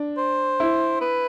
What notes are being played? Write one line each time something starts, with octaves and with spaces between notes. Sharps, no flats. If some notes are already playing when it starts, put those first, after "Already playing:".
Already playing: D4
C5
E4
B4